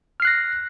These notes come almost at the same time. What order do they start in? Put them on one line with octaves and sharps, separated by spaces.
F6 C7 F#6 A#6